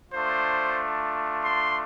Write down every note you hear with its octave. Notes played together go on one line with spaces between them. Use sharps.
A3 D4 F4 C5
C6